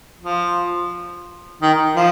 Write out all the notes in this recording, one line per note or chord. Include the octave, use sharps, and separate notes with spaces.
F3
D#3
F3